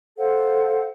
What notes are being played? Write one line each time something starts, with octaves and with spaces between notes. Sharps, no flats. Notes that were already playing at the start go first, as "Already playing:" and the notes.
A4 C5 F5 F#5